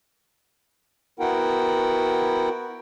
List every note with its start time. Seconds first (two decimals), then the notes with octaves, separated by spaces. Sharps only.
1.20 B3 E4 F#4 A#4 F#5 G5